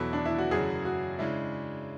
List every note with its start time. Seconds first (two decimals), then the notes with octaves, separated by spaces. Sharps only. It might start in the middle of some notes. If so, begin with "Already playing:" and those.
Already playing: E2 B2 F#3 B3 E4 A4
0.13 D4
0.25 E4
0.38 F#4
0.51 F#2 C#3 F#3 G#4
0.85 F#4
1.18 C#3 G#3 D4 E4